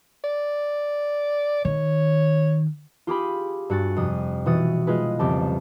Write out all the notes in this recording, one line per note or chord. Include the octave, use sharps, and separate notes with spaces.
D5
D#3 C#5
F4 G4 G#4 B5
G2 F#4 G#5 A6
F2 C3 D#6
B2 E3 F#4 D#6 A6
G#3 F4 G#4 B4
C2 F2 C#3 C4 G4 A5